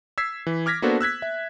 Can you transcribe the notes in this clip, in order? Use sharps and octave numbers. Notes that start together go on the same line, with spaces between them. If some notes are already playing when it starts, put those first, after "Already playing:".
E6 G#6 B6 C7
E3
D6 F6 G#6 A#6 B6
A#3 B3 D4 F#4 A4 C5
E6 F#6 G#6 B6
E5